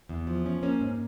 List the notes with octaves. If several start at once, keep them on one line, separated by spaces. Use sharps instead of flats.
E2
F3
C#4
A#3 C#4
G#2